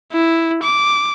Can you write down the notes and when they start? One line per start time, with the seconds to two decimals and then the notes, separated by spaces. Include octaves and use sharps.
0.12 E4
0.63 D6